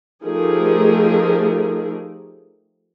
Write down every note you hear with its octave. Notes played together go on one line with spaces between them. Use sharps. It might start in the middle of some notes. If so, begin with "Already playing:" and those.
F3 A3 D#4 G4 G#4 A#4